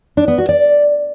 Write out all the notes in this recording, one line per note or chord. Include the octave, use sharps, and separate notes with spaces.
D4
B3
F#4
D5